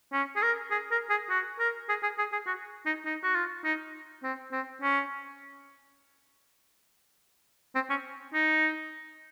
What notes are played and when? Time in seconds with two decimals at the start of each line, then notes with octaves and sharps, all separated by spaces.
0.13 C#4
0.36 G#4
0.43 A#4
0.71 G#4
0.91 A#4
1.10 G#4
1.30 F#4
1.59 A#4
1.89 G#4
2.03 G#4
2.18 G#4
2.32 G#4
2.47 F#4
2.86 D#4
3.05 D#4
3.23 F#4
3.35 F4
3.64 D#4
4.24 C4
4.52 C4
4.82 C#4
7.75 C4
7.90 C#4
8.34 D#4